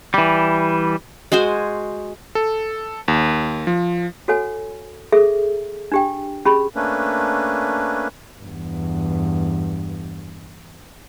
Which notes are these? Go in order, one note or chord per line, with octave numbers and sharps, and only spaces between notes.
E3 G3
G#3 F#4 C5 G#5
A4
D#2
F3
F#4 A4 C#5 F#5 G#5
G#4 A4 E5
D4 G4 G5
C#4 G4 G#4 B5
A3 A#3 C#4 D4 B4
E2 G2